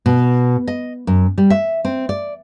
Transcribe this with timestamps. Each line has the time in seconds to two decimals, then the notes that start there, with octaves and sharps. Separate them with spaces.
0.06 B2
0.68 D#5
1.07 F#2
1.38 G3
1.50 E5
1.85 C4
2.09 D5